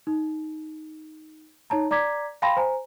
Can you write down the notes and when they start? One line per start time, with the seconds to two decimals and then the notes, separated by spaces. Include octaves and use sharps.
0.07 D#4
1.70 D#4 C#5 A5 A#5
1.91 D5 A#5 D6 G#6 B6
2.42 F5 G5 A5 B5 C6 A#6
2.57 C5 G#5 A#5